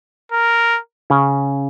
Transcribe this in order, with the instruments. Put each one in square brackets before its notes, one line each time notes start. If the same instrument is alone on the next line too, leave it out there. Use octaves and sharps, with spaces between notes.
[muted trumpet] A#4
[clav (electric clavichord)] C#3 C#4